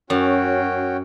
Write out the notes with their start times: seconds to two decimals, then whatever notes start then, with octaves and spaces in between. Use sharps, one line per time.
0.10 F#2 C#4 F#4 G5